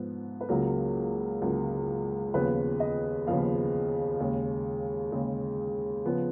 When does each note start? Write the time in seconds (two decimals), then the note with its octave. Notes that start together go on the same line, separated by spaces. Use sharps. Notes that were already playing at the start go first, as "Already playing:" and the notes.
Already playing: G#2 F3 B3
0.41 B4
0.49 C#2 C#3 F#3 A#3 A#4
1.41 C#2 C#3 F#3 A#3
2.34 D#2 C#3 F3 B3 B4
2.80 D#5
3.26 D#2 C#3 F3 B3 F5
4.20 D#2 C#3 G#3
5.12 D#2 C#3 G#3
6.06 C#3 F3 B3